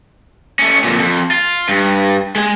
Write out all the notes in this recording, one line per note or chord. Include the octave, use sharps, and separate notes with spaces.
A3 C#4
F2 A#2
F2
F4
G2
G#3 G#5